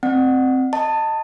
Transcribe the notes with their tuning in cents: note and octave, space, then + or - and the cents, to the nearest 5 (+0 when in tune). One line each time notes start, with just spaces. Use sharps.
C4 -5 D5 +45 F#5 +0
D#5 +0 A5 +20